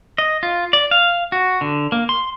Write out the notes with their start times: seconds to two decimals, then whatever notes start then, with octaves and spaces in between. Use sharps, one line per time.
0.18 D#5
0.43 F4
0.73 D5
0.91 F5
1.32 F#4
1.61 D3
1.92 A#3
2.09 C6